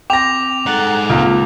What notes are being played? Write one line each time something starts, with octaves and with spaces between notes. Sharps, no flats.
C4 G5 D6 A#6 F7
G#2 A4 F#5 A#5
C#2 A#3 C4 F4